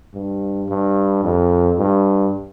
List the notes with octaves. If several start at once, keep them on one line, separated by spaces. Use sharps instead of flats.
G2
G2
F2
G2